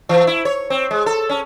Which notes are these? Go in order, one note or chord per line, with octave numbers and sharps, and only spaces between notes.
E3
E4
C#5
C4
G#3
A4
C#4